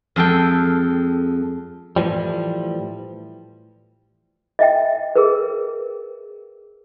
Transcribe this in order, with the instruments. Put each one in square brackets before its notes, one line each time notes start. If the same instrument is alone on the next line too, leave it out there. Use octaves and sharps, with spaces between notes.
[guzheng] F2 G#3 A4 G5
[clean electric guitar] A2 E3 F3 G3
[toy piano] D#5 E5 G5
G#4 A#4 B4